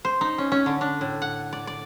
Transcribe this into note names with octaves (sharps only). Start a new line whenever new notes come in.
C5
D#4
C#4
C#4
D3
D4
A2
F#5
D5
D5